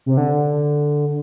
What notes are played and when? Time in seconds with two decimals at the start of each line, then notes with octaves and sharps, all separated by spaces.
0.06 C3
0.17 D3